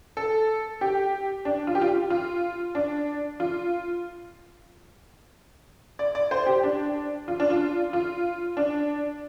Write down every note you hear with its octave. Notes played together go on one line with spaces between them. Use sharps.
A4
G4
D4
F4
G4
F4
F4
D4
F4
D5
D5
C5
G4
D4
F4
D4
F4
F4
D4